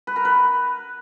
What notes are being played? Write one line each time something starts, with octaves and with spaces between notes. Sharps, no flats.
B4
A#4
B4